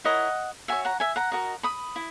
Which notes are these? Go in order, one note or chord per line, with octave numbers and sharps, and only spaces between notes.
E4 A#4 C#5 D#5 F#5
F#4 C#5 E5 G#5
F#5 A#5
E5 G#5
F#5 A#5
F#4 A#4 D#5
B5 D#6
E4